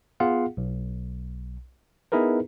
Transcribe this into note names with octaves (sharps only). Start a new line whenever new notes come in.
B3 F4 G#4 F5 F#5
B1
B3 D#4 E4 G#4 A#4 B4